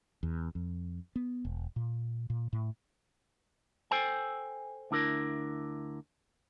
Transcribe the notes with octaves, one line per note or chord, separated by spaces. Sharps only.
E2
F2
B3
E1
A#2
A#2
A2
A4 C5 G5 G#5
D2 D4 E4 A#4